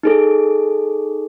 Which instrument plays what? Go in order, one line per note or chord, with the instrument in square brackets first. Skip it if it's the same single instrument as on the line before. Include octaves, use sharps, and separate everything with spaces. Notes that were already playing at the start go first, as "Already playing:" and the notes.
[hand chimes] D#4 G#4 A4